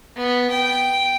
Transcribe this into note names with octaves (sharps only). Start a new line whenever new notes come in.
B3
G5